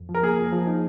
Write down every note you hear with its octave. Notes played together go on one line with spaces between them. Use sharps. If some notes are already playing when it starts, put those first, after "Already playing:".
Already playing: F2
F3
A#4
A#3 G#4
F3
F3
D#4